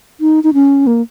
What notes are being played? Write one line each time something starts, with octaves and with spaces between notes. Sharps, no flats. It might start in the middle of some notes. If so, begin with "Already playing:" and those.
D#4
D#4
C#4
A#3